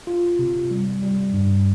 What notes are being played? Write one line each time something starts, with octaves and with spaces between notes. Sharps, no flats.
F4
C3
G3
G3
G2